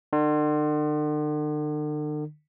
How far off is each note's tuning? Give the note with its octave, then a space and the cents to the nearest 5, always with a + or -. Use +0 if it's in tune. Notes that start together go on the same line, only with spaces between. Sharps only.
D3 +45